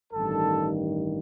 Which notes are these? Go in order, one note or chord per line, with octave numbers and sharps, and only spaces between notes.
A1 G2 D#3 A4 A5